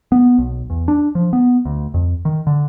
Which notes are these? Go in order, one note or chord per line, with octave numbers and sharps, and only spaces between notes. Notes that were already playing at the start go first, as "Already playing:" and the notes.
B3
B1
E2
D4
F3
B3
D2
F2
D#3
D3